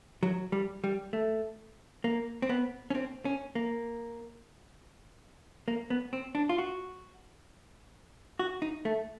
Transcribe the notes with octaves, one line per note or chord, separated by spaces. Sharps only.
F#3
G3
G3
A3
A#3
C4
B3
C#4
C4
C#4
A#3
A#3
B3
C4
D4
F4
F#4
F#4
D#4
A3